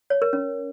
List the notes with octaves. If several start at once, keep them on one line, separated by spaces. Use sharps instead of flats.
C#5
A#4
C#4